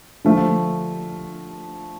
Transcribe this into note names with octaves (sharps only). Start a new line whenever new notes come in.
D3 F3 A3